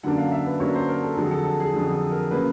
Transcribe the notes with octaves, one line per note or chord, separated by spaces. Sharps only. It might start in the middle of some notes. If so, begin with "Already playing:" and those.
F#2 D3 F#3 A#3 D4 F#5
F5
E5
B4
F#2 D3 F#3 A#3 D4 C#5
C5
A#4
A4
F2 D3 F#3 G#4
A4
A4
G#4
F2 D3 F#3 G#4
A4
A#4
C#3 F#3 A#3 B4